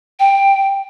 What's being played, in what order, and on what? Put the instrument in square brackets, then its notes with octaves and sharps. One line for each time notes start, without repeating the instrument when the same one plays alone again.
[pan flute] G5